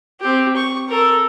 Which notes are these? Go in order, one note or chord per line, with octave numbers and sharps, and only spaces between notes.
C4 G4
C#6
A4 A#4